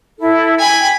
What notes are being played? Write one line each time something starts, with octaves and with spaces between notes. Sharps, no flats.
E4 A4
G5 G#5 B5